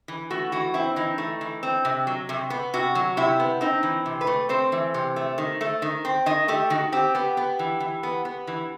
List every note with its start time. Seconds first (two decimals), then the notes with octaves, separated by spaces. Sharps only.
0.08 E3
0.30 A3 F#4
0.52 E3 F#4
0.74 C4 E4
0.96 E3 D#4
1.18 A3
1.41 E3
1.63 C4
1.85 C3
2.07 F#3
2.29 C3
2.50 B3
2.74 C3 F#4
2.95 F#3
3.17 C3 E4
3.40 B3
3.61 C4 D#4
3.83 E3
4.06 C3
4.21 B4
4.27 A3
4.49 C4 C5
4.72 E3
4.94 C3
5.16 A3
5.38 D#3
5.61 A3
5.82 D#3
6.05 C4
6.26 D#3 D#5
6.48 A3 G4
6.70 D#3 F#4
6.92 C4 G4
7.15 B3 G4
7.37 B3
7.59 E3
7.80 E3
8.03 B3
8.25 B3
8.47 E3